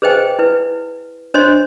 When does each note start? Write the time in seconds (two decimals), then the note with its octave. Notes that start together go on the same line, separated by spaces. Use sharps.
0.02 G#4 B4 C5 D#5 G5 G#5
0.39 E4 B4
1.34 D4 C5 C#5 D#5 C6